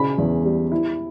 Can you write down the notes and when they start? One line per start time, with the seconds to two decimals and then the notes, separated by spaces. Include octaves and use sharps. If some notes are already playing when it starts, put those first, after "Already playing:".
Already playing: C#3 B5
0.18 E2
0.45 G3
0.72 E4